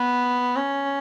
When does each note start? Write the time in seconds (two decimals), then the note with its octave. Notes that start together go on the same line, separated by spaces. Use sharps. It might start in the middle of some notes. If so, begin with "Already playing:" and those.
Already playing: B3
0.56 C#4